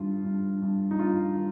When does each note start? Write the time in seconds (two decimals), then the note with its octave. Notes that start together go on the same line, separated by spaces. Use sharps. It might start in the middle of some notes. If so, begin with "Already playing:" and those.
Already playing: G2 D#3 F4
0.25 G2
0.62 G2
0.91 D#4
0.99 G2 F4
1.36 D#3